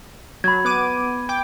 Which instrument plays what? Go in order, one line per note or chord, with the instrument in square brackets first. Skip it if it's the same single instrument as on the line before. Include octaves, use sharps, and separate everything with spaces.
[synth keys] F#3 [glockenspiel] B5 G#6
[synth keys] B3 D6 D#7
G5 D6